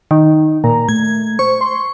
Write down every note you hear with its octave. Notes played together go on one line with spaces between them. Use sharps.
D#3 D#4
A#2 A#5
A3 G#6
C5 C#6
C6